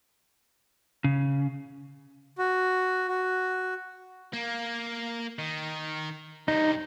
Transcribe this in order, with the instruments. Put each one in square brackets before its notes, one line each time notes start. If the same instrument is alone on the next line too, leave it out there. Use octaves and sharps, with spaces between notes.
[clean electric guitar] C#3
[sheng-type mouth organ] F#4
F#4
[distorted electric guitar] A#3
D#3
[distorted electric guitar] G2 C3 [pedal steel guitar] D#4